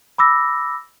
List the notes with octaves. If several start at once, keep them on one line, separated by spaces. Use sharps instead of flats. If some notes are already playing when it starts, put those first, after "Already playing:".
B5 D6 E6 A#6